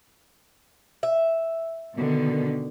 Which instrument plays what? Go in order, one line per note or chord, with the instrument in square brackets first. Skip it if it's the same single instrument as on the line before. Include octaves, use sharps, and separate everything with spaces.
[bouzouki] E5
[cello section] B2 D3 D#3